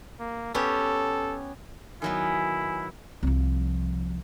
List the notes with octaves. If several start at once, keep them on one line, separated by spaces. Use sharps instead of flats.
A#3
B3 C#4 G4 A4
D#3 F#3 B3 E4 G#5
C2 F3